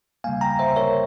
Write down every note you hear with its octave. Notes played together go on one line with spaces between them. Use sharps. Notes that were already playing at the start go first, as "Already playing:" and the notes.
C#3 G3 A#3 F5 G#5
G5 A#5
C5 E5
A#4 C#5